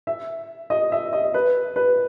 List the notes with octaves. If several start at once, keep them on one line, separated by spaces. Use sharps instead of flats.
E5
D#5
E5
D#5
B4
B4